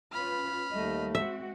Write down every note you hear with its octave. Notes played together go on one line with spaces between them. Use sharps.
C#4 F4 B4 B5 F6
D#2 G3 A3 D#5
G#3 C4 F#4 E5